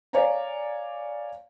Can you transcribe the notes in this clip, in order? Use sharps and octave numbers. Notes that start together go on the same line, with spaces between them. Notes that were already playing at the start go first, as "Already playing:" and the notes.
C#5 D5 F5 G#5 A#5